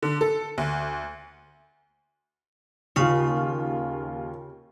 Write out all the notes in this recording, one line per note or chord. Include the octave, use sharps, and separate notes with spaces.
D3
A4
D2
D#2 C#3 D#4 F4 C#6